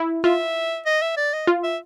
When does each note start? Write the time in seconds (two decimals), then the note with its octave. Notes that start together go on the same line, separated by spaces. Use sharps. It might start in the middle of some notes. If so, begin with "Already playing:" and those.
Already playing: E4
0.24 F4 E5
0.86 D#5
1.02 E5
1.17 D5
1.33 D#5
1.47 F4
1.63 E5